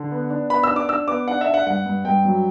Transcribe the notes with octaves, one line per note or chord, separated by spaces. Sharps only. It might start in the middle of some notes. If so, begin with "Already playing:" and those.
Already playing: D3
B3
D4
B3 B5
E6
D4
D6
D4 E6
B3 D6
D4 F#5
E5
D4
F#5
G2 F#5
G2
G2 G5
F#3